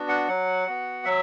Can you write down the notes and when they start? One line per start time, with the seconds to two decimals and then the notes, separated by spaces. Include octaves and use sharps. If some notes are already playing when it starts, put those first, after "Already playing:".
Already playing: B3 D4 F#4
0.09 F#5
0.28 F#3 F#5
0.66 B3 F#4
1.05 F#3 E5